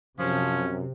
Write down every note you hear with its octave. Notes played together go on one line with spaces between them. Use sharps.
F#2 C3 F3 C#4